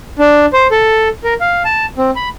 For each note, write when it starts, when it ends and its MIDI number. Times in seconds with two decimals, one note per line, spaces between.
0.19 0.46 62
0.53 0.67 72
0.71 1.09 69
1.24 1.34 70
1.41 1.63 77
1.65 1.86 81
1.98 2.11 60
2.16 2.29 83